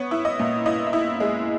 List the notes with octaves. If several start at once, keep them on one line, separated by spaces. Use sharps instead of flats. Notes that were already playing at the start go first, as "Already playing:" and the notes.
Already playing: B3 C#5
E4
D#5
A#2
E4 D#5
E5
E4
G#3